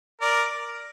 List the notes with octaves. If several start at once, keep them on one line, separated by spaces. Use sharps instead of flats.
A#4 D5